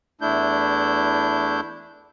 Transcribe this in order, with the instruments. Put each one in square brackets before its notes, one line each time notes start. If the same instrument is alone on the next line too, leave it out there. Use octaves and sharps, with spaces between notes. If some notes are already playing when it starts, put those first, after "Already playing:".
[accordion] E2 A3 D4 E4 G6